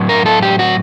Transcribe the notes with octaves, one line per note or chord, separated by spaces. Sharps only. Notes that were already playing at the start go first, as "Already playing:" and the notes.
Already playing: A2 F#3
A#4
A4
G4
F#4